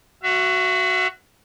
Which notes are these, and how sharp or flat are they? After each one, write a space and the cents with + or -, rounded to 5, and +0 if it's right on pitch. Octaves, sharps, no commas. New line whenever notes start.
F#4 +0 E5 +40